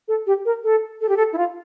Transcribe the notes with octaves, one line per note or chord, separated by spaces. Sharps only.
A4
G4
A#4
A4
A4
G4
A4
E4
F4